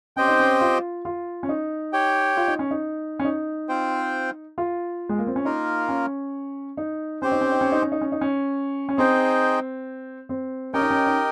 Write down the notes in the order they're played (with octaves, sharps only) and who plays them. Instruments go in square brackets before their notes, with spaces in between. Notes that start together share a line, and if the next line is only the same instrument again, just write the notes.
[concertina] C4 G4 C5 D#5 G5 [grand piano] C#4
[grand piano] D#4
C#4
F4
F4
C#4
D#4
[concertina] G4 C#5 G5
[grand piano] F4
D#4
C#4
D#4
C#4
D#4
[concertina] C4 F4 C5 G5
[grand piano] F4
G#3
A#3
C4
C#4
[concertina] A#3 F4 A#4 [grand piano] D#4
[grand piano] C#4
D#4
[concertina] C4 G4 C5 [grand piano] C#4
[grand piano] D#4
C#4
D#4
C#4
D#4
C#4
D#4
C#4
D#4
C#4
C#4
[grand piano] C4 [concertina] D#4 G#4 C5 D#5 G5
[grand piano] C4
[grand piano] C#4 [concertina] G4 A#4 D#5 G5
[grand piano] D#4
C#4
D#4